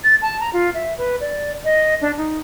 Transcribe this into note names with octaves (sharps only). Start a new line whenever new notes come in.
A6
A5
A#5
F4
E5
B4
D5
D#5
D4
D#4